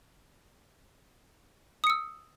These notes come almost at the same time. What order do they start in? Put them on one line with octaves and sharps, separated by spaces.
D#6 C#7 E6